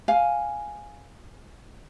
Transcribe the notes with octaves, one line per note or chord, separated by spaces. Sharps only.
F5 G#5